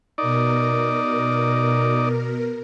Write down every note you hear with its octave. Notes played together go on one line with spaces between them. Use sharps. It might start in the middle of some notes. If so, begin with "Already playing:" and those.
B2 D#4 A#4 D5